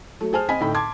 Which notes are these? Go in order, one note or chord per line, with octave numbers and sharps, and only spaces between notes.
F#3 A3
G#4 C5 G#5 A5 F6
C4 D#5 G#5 B5 B6
A2 D3 D#4 D#5 G5 B5
A5 C6 D6 G#6